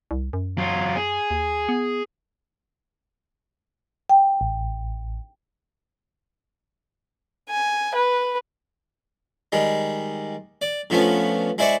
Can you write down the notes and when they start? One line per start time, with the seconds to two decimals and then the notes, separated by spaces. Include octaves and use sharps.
0.11 C2
0.33 F#2
0.58 F#3 F4
0.96 G#4
1.31 D#2
1.69 B3
4.09 G5
4.41 A1
7.49 G#5
7.95 B4
9.52 D#3 G3 G#3
10.62 D5
10.90 D3 F3 A3 B3 C#4
11.58 G#3 E4 C5 D5 E5 C#6